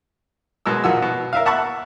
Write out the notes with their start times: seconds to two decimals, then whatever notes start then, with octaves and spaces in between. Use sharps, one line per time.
0.66 B2 G#3 A#4 E6
0.84 A#2 F3 F#4 E6
1.02 B2
1.33 A#4 E5 F5
1.45 E5 F#5 A5 B5 C#6 F#6